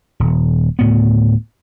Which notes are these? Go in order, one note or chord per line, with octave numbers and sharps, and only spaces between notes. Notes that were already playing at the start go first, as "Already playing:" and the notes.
D#1
D2 A2 B3